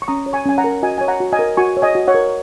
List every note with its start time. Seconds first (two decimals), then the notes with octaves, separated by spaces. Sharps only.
0.02 C#6
0.08 C#4 A#5 D#6
0.26 C#5
0.33 G#5 C#6
0.46 C#4 G#5
0.58 F#5 A#5
0.64 A#4
0.83 F#4 D#5 G#5
0.98 C#5 G#5
1.08 F#5 A#5
1.20 F#4
1.33 D#5 G#5
1.39 A#4
1.57 F#4 G#5 C#6
1.77 C#5
1.82 D#5 G#5
1.95 F#4
2.08 C#5 F#5
2.14 A#4